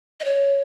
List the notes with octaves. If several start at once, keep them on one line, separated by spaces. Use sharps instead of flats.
D#5
C#5